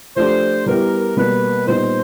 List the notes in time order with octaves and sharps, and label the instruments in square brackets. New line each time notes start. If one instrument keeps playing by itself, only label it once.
[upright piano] F3 A3 D4 G4 [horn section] C5
[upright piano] G3 B3 E4 G4 [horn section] A#4
[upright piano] B2 G3 A#3 [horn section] B4
[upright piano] A#2 G3 B3 D#4 [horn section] C5